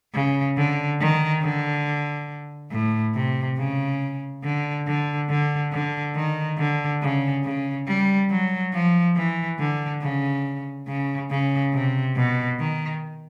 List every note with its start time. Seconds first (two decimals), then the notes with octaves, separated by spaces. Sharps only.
0.14 C#3
0.57 D3
1.00 D#3
1.43 D3
2.72 A2
3.15 C3
3.58 C#3
4.44 D3
4.87 D3
5.29 D3
5.72 D3
6.15 D#3
6.58 D3
7.01 C#3
7.44 C#3
7.87 G3
8.30 F#3
8.73 F3
9.16 E3
9.59 D3
10.02 C#3
10.87 C#3
11.31 C#3
11.74 C3
12.16 B2
12.59 D#3